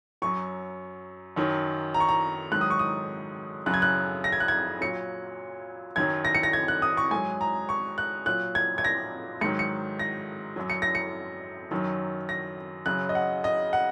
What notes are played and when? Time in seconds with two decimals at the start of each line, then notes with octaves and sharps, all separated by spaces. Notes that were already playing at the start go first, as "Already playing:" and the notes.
0.22 F#2 F#3 C#6
1.36 F#2 D#3 F#3
1.94 A#5
2.00 C#6
2.09 A#5
2.52 G#2 D#3 F#3 F#6
2.61 D#6
2.70 C#6
2.79 D#6
3.66 F#2 C#3 F#3 F#6
3.74 G#6
3.82 F#6
4.24 A#6
4.32 G#6
4.40 F#6
4.48 G#6
4.81 A#2 F#3 C#7
5.96 F#2 D#3 F#3 G#6
6.25 A#6
6.35 C#7
6.43 A#6
6.53 G#6
6.68 F#6
6.82 D#6
6.97 C#6
7.11 G#2 F#3 G#5
7.41 A#5
7.69 C#6
7.98 F#6
8.26 A#2 F#3 F#6
8.55 G#6
8.78 G#6
8.84 A#6
9.41 G#2 D#3 F#3 C#7
9.59 C#7
9.99 A#6
10.56 F#2 F#3
10.70 C#7
10.82 A#6
10.95 C#7
11.71 F#2 D#3 F#3
12.29 A#6
12.86 F#2 C#3 F#3 F#6
13.09 D#5
13.15 F#5
13.44 D#5
13.73 F#5